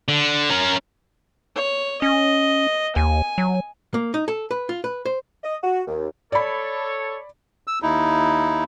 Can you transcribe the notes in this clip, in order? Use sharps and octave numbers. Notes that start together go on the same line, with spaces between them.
D3
C#4 A#4
C#5
C#4 D#5
D#2 G#5
F#3
A#3
D#4
A4
B4
F4
B4
C5
D#5
F#4
D#2
A4 C#5 D5 B5
E6
D#2 D#4 E4